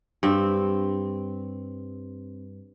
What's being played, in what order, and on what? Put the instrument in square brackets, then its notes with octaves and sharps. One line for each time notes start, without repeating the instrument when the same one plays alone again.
[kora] G2 C4